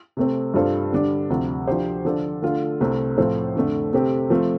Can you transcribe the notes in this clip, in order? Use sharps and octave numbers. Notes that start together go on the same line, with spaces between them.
C3 A3 C4
G2 G3 F4 A4 C5
D3 G3 D4
D2 C3 F3
F3 D4 G4 C5
D3 F3 D4 A4
D3 A3 F4 A4
C2 C3 A3 C4
A2 F3 C4 A4 C5
F2 D3 A3
C3 A3 C4 G4
F3 A3 C4 F4